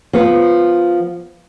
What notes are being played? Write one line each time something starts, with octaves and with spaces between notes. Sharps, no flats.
F3 B3 B4